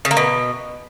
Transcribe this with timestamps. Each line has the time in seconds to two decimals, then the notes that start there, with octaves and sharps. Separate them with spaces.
0.05 C#3
0.11 A#3
0.17 B2